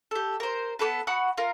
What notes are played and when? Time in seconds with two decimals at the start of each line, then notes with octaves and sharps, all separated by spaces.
0.11 G4 A4
0.40 A#4 C5
0.79 B3 G4 A4 B4
1.07 F#4 F#5 B5 D#6
1.38 F4 A#4